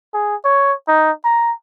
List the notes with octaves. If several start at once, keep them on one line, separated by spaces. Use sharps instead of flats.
G#4
C#5
D#4
A#5